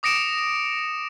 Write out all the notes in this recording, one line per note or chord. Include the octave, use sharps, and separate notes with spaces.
D6 D#6 A#6 C#7 D7 E7